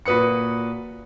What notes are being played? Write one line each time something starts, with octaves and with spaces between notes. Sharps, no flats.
A#2 F#4 B4 D#6 C#7